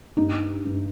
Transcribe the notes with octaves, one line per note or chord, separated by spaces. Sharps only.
G2 D#4
G2